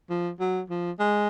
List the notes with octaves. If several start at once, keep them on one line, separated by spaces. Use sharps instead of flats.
F3
F#3
F3
G#3